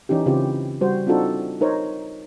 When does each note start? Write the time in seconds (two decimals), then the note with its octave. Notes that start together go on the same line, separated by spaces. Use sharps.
0.09 E3 C#4 D#4 G4
0.26 C#3 C4 E4 F4 G4
0.81 G3 F#4 C5
1.07 C4 D4 D#4 F4 F#4 A4
1.61 D#4 A#4 C5 C#5